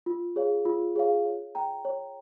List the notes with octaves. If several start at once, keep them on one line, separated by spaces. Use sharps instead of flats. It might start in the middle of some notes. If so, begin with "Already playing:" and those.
F4
G#4 C#5 F5
F4
G#4 C#5 F5
C#5
G5 A#5
C#5